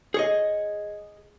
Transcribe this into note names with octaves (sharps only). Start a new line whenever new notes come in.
G#4 C#5 D#5